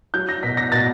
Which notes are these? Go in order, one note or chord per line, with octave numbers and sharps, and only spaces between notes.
F#3 G6
A#6
B2 B6
A#6
B2 A6